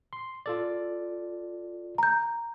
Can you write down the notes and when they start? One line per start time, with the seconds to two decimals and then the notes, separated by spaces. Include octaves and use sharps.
0.13 C6
0.46 F4 A4 D5
1.98 A#5 G6